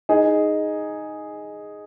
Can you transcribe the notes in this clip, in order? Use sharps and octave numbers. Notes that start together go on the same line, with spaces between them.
D#4 G#4